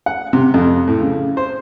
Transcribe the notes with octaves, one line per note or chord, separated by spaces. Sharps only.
F#5
C3
F2
A2
C#3
C5